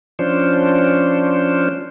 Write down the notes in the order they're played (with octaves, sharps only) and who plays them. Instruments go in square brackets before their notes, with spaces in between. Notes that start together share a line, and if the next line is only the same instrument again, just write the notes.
[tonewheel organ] F3 C#4 D4 C5